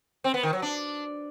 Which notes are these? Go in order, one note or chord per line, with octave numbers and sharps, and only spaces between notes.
C4
B3
D#3
F#3
D4